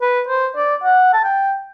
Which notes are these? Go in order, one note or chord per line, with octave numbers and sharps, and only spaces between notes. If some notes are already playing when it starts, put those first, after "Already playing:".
B4
C5
D5
F#5
A5
G5